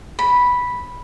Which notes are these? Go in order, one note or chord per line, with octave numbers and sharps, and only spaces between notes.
B5